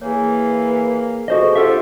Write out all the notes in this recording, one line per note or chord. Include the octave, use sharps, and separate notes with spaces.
E3 A#3 G#4 C#5
B2 F#4 G#4 A4 C5 D#5 C#6
D4 F4 G4 A4 C5 E5 F#5 E6